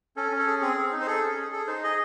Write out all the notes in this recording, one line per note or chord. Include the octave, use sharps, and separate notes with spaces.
C#4 A4
C#4
A4
G#4
C4 G#4
C4
D#4
C5
G#4 A4
C#4
G#4
G#4 A4
D#4 C5
G#4 D#5